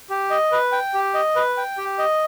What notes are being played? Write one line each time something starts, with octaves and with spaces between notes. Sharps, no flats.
G4
D#5
B4
G5
G4
D#5
B4
G5
G4
D#5